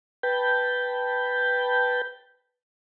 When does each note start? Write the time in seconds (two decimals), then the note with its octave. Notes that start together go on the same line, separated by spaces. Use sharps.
0.23 B4 G5 A5 B5 G6